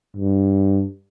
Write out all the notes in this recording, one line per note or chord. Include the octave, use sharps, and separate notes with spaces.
G2